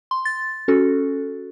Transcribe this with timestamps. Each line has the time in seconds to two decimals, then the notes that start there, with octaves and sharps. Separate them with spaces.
0.11 C6
0.25 A6
0.68 C#4 F#4 A4